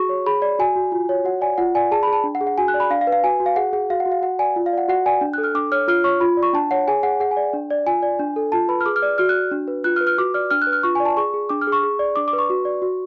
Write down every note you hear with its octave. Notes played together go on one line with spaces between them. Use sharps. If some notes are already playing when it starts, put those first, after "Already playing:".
Already playing: F#4 G#4 C#6
C#5
G#4 B5
D5
F#4 G#5
F#4
F4
C#5
F#4 F#5
D5 G#5
F4 F#5
D5 G#5
G#4 A5
B5
G#4
A5
D4
F#5
G#4
F#5
F#4 G#5
F#6
D5
B5
D4 F5
F5
B4
F5
F#4 G#5
F#4
F5
G#4 F#5
G#4 F#5
F#4 F5
F#5
F#4
F5
F#4 F#5
D5 G#5
F4
F5
D5 F#5
F#4 F#5
D5 G#5
D4
F#6
A4
F6
D4 D6
C#5 F6
F4 F6
C#5 C#6
F4 B5
D5
C#6
D4 A5
C#5 F#5
G#4 G#5
G#4 F#5
G#4 F#5
G#5
D5
D4
D5
F4 G#5
D5
D4
A4
F4 A5
B4 B5
F6
G#4 D6
F6
D5
F#4 F6
F#6
F#4
D4
B4
F4 F#6
F6
B4
F6
F#4 D6
D5 F6
D4 F6
F#6
B4
F6
F4 C#6
G#5
D5
A5
G#4 C#6
G#4
D4 D6
F6
G#4
C#6
G#4
D5
D4 D6
D6
B4
C#6
F#4
D5
F#4